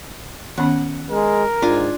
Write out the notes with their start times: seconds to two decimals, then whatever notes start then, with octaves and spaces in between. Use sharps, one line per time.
0.58 D#3 B3 C#4 F#5
1.11 G#3 A#4
1.62 G#2 D4 F4 G#5